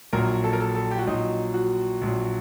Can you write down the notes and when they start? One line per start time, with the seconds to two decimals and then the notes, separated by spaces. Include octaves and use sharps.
0.13 A#1 A#2 F#3 A#4
0.44 A4
0.53 A#4
0.60 A4
0.75 A4
0.91 G4
0.98 F#4
1.06 A#1 A#2 F#3 D#4
1.54 F#4
2.01 A#1 A#2 F#3